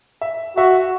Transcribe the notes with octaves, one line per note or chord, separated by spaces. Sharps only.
E5
F#4 E5